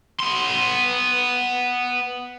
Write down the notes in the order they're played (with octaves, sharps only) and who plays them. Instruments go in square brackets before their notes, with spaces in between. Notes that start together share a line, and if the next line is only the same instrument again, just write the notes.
[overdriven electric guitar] B3 C6